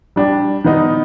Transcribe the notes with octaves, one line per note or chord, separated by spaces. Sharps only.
G3 D4 G4
D#3 B3 D#4